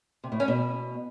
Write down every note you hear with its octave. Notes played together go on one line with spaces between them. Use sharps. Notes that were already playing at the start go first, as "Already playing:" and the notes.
C3
A2
C#4
B2